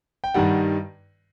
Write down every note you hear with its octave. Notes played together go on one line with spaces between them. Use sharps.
G5
G2 D#3 G3 F#5